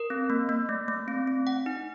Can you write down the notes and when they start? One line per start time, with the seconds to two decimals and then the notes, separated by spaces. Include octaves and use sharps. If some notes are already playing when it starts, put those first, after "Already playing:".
Already playing: A#4
0.10 C4
0.30 A#3
0.49 A#3
0.69 A3
0.88 A3
1.08 C4
1.27 C4
1.47 F#5
1.66 D#4